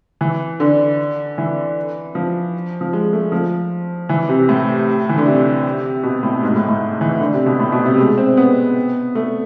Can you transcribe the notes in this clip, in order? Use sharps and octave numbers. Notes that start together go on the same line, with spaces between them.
E3
D3
E3
F3
F3
G#3
A3
F3
E3
C3
A2
E3
D3
C3
B2
A2
G#2
A2
A2
E3
D3
C3
B2
A2
B2
C3
G#3
C4
B3
A3